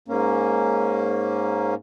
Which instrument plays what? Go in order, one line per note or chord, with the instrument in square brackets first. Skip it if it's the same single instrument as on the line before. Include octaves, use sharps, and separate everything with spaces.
[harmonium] G#2 A#3 C#4